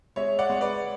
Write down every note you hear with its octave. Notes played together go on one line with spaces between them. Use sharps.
G#3 C#5 E5
D5 F#5
G#3
B4 D5